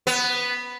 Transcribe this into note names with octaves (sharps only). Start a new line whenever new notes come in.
B3